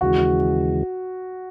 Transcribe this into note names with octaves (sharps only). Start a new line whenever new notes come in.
D#2 C#3 E3 G#3 F#4